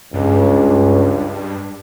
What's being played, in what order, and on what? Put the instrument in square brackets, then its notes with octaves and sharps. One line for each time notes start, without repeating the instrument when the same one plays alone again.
[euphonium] C#2 [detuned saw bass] G2